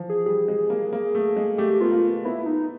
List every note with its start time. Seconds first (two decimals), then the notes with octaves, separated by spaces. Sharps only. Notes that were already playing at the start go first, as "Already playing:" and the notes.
Already playing: E3 F3
0.10 G#4
0.26 G3 G#4
0.48 G#3
0.70 A#3
0.93 A#3
1.15 A3
1.36 G#3
1.58 A3 G4
1.81 B3 F4
1.92 A#3
2.25 B3 E4
2.46 D#4